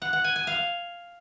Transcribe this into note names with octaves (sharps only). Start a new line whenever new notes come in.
F#5
F#5
G#5
G#5
F5